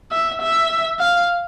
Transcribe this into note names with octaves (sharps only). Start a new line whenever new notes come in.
E5
E5
F5